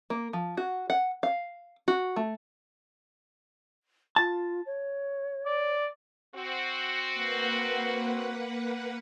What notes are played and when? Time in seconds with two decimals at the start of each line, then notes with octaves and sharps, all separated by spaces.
0.10 A#3
0.33 F3
0.57 F#4
0.90 F#5
1.23 F5
1.88 F#4
2.16 A3
4.16 F4 A5
4.66 C#5
5.46 D5
6.35 C4 F#4
7.13 A#3 B4 F#5